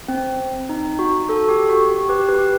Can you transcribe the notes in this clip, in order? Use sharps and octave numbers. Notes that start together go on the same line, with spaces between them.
C4
D#4
F#4
F#4 A4
G4
F#4
G4
G4 B4
G4 B4